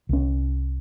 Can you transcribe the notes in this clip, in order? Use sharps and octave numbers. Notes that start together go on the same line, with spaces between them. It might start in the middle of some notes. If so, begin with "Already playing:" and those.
C2 C#4